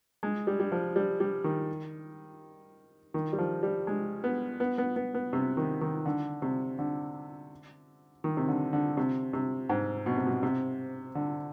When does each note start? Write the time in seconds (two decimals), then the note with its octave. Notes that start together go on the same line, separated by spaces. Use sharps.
0.23 G#3
0.47 G3
0.60 G3
0.72 F3
0.96 G3
1.20 G3
1.44 D#3
3.14 D#3
3.33 G3
3.38 F3
3.63 G3
3.87 G#3
4.24 B3
4.60 B3
4.78 B3
4.96 B3
5.14 B3
5.33 C3
5.57 D#3
5.81 D#3
6.06 D3
6.42 C3
6.79 D3
8.24 D#3
8.37 C3
8.48 D3
8.73 D3
8.97 C3
9.33 C3
9.69 G#2
10.06 B2
10.16 C3
10.27 B2
10.43 C3
11.15 D3